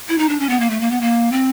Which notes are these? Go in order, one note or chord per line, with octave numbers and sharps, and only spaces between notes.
E4
D#4
D4
C#4
B3
A#3
A3
A#3
B3
A#3
C4